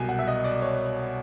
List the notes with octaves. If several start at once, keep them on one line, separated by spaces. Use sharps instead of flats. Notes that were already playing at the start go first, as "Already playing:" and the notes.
Already playing: C2 B2 F#3 G#5
F#5
E5
D#5
D5
C#5